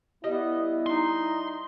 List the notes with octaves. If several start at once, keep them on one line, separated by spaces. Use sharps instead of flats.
G3 B3 E4 D#5
D#4 C6